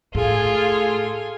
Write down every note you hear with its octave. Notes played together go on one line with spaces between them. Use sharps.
A2 F4 G#4 A4 G#5